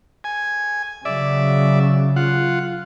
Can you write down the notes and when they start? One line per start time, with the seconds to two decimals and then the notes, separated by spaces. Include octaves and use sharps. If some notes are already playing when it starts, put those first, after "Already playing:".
0.24 G#5
1.05 C#3 F#3 D5 E5
2.16 F4 F#5